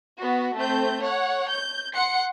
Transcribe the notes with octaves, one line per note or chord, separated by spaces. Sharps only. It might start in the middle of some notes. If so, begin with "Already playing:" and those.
B3 F#4
A3 C4 G6
C#5 F#5
G6
F#5 C6 C#7